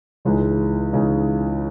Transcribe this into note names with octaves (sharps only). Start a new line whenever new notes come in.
C#2 C#3 E3 G#3 D#4
C#2 C#3 E3 G#3 D#4